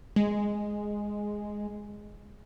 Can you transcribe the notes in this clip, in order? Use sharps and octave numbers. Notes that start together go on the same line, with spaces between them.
G#3